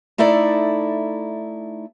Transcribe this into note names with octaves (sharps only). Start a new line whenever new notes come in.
A3 D#4 E4 A4 D5